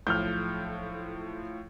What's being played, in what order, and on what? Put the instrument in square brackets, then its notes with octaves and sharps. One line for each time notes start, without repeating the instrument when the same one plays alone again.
[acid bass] B1 [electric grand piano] A2 F3 [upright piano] F6 G6